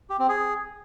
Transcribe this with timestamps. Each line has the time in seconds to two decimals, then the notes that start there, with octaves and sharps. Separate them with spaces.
0.10 G4
0.19 C4
0.29 G#4